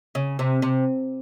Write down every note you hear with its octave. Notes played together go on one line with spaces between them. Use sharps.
C#3
C3
C3